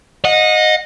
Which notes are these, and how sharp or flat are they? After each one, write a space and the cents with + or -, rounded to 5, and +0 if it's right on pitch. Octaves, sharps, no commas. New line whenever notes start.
D#5 -5 F#5 -35